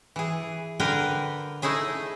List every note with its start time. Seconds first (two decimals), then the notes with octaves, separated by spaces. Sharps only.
0.16 E3 G#4
0.80 D3 A#4 B4 G5 G#5
1.62 A3 D#4 E4 G#4 E5